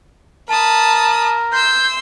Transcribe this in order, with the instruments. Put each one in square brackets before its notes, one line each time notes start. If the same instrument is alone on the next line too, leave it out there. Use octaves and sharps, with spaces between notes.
[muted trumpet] A#4 [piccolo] A5 [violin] B5 D#6
[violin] C6 E6 [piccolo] G6